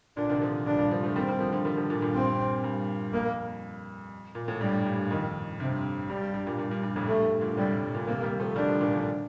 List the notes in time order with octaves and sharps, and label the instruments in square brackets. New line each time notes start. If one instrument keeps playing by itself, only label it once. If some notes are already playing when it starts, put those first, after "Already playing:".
[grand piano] A#2 D3 [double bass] D4
[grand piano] C3 D#3
D3 F3
[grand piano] G2 A#2 [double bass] D4
[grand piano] G2
D3 F3
F3 A3
[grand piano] D#3 G3 [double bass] C4
[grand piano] D#3 G3
D3 F3
D3 F3
D#3 G3
D3 F3
A#2 D3
G2 A#2
[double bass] C4
[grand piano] G2
[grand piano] F2 [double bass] A#3
[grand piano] A#2
A2
[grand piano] G2 [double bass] G3
[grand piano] G2
[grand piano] F2 [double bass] D#3
[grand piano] G2 [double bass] C3
[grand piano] G2 [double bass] G3
[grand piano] G2
G2
G2 A#2
G2 A#2
G2
G2
F2 A2
[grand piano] G2 [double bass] A3
[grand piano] G2
A#2 D3
[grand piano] A2 C3 [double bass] G3
[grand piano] A#2 D3
[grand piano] C3 D#3 [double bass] A#3
[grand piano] D#3 G3
F3 A3
[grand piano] D#3 G3 [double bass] D4
[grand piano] D3 F3
A#2 D3
A#2 D3